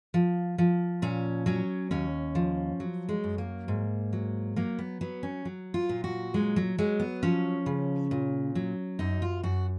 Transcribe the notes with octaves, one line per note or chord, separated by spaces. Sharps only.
F3
F3
A#2 C#4
F#3 C#4
D#2 C#4
F3
F#3
G#3
F#2
A#3
G#2
F#3
F#3 A#3
B3
F#3 B3
C#4
F#3
F4
A#2
F#4
F#3 G#3
F#3
F#3 G#3
B3
F3 C#4
C#3
A#2
F#3
F#2 D#4
F4
F#2 F#4